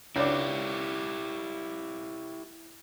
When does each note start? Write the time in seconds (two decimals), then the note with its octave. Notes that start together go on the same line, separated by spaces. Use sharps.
0.16 C#2 D4 E4 G4